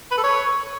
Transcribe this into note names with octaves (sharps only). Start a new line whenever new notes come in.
B4
A4
C#5